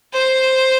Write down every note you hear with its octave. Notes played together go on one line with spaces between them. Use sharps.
C5